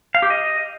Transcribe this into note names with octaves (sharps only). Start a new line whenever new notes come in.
F5
G4
D#5